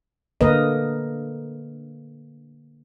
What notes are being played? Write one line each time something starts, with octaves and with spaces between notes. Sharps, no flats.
D3 A#3 A#4 B4 D#5